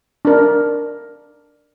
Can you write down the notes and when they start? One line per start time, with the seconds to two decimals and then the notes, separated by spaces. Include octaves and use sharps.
0.25 D4 A#4